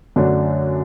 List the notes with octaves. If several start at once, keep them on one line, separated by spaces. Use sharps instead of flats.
F#2 D3 F#3 A3 D4